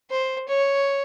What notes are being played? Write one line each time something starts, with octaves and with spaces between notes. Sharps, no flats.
C5
C#5